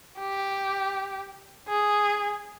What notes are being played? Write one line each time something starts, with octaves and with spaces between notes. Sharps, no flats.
G4
G#4